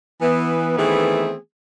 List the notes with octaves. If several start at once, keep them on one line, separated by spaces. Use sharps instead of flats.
E3 B3
D#3 E3 A3 B3 C4 G#4